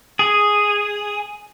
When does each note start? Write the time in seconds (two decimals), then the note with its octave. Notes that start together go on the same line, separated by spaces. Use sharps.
0.19 G#4